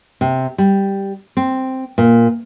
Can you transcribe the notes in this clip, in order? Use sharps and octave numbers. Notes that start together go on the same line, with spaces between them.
C3
G3
C4
A#2